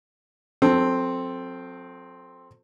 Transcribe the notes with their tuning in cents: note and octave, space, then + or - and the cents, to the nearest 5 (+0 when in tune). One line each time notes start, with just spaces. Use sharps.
F#3 -40 C4 +0 A4 +0